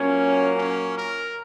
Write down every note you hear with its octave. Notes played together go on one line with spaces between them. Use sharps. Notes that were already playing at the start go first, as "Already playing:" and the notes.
Already playing: A#2 F#3 A#3 C#4
C#4
A#4